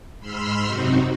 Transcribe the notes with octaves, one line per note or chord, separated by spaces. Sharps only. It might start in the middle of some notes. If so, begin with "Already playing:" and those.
G#2 B5 C6 E6 F6
F#2 C3 C4 D#4 F#4